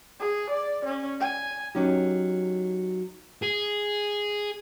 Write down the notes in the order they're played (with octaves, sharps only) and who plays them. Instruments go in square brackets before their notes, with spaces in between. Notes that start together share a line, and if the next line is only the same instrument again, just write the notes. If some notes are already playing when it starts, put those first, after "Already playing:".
[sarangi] G#4
D5
C#4
G#5
[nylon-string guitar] F#3 C#4 D#4 G4
[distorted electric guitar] G#4